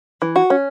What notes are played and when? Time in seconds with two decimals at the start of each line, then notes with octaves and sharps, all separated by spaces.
0.22 E3
0.36 F#4
0.50 C#4